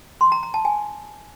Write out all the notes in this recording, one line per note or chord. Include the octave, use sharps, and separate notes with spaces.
C6
A#5
A#5
A5
G#5